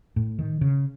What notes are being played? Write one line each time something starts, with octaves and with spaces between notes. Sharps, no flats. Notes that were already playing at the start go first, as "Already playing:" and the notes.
A2
D#3
C#3